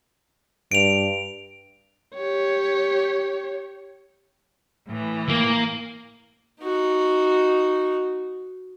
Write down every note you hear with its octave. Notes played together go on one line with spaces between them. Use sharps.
G2 D7 F7
G4 C#5
A2 E3
A#3
D#4 F#4